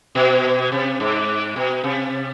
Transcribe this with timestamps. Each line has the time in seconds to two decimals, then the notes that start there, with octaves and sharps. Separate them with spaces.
0.15 B2
0.72 C3
1.00 G#2
1.56 B2
1.84 C3